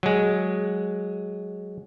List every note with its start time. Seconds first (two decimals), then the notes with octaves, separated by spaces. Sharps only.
0.03 F#3 G#3